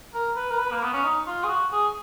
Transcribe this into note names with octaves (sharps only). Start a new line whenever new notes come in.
A#4
B4
A#4
B4
A#3
B3
C#4
D#4
F4
G#4
F#4
G#4